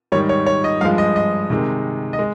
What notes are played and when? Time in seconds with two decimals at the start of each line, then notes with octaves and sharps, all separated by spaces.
0.12 G#2 D#3 G3 C#5
0.29 C#5
0.46 C#5
0.64 D#5
0.81 G2 F3 G#3 F5
0.98 D#5
1.16 D#5
1.50 C3 D#3 G#3
2.13 D#5
2.19 G#3